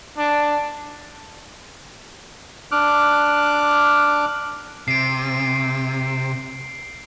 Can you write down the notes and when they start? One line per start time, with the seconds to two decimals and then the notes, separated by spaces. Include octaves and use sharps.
0.18 D4
2.72 D4 D6 F6 F#6
4.88 C3 C7 D7